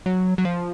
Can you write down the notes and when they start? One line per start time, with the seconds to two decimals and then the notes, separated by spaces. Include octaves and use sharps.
0.06 F#3
0.38 F#3
0.45 F3